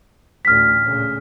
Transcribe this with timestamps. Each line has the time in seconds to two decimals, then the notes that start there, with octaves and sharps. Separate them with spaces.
0.45 A1 D2 F6 B6
0.83 A#2 C#3